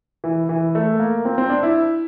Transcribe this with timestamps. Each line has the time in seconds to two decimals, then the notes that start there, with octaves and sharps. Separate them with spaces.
0.24 E3
0.49 E3
0.75 A3
0.99 A#3
1.25 C4
1.38 C4
1.50 D4
1.63 E4